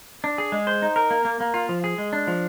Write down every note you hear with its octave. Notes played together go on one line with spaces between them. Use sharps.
D4
G#4
G#3
C5
D#4
A#4
A#3
A#3
A#3
F4
F3
G#4
G#3
D4
F3